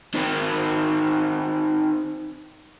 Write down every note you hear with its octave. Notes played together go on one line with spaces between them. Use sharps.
D#3 C4